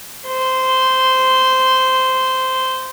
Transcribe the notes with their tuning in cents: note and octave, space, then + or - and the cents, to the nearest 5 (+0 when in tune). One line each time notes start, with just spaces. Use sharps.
C5 -10